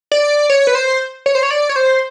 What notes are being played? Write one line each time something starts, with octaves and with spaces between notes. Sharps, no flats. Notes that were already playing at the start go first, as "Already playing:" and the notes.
D5
C#5
B4
C5
C#5
C5
C#5
D5
C#5
C5